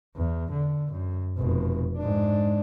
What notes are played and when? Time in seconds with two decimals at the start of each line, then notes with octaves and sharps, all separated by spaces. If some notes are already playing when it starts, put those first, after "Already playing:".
0.16 E2
0.51 D3
0.91 F#2
1.38 F1 B2
1.97 G#2 D4